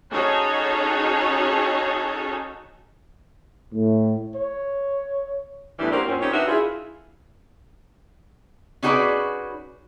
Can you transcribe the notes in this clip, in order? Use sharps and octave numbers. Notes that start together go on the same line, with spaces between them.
C#4 D#4 F#4 G#4 A4 C#5
A2
C#5
E2 A2 E3 G3 D4
F#3 A#3 C4 C#4 G4 A#4
F#2 A#2 C4 C#4
C4 D#4 G4 C#5
D4 D#4 F#4 A#4 B4 E5
E4 F4 G#4
C#4 D#4 F#4 G#4 B4 D5